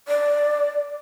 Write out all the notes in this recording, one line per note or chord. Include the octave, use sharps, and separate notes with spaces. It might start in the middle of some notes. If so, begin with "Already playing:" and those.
D5